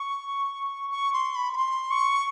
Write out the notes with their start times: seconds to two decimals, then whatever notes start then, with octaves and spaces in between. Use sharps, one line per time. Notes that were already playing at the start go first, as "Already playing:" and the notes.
Already playing: C#6
0.91 C#6
1.13 C6
1.36 B5
1.53 B5
1.57 C6
1.91 C#6